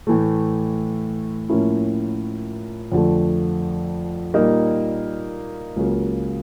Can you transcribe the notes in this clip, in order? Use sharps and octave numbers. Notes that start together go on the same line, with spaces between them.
A2 E3 A3
A2 F3 A#3 C#4 E4
F2 D3 F3 A3
A#2 G3 A#3 D#4
C#2 C#3 F#3 A#3